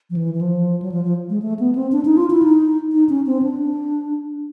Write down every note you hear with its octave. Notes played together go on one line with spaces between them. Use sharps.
F3
E3
E3
F3
F#3
F3
F3
G#3
A3
B3
C4
D4
D#4
F4
E4
D#4
D#4
C#4
C4
D4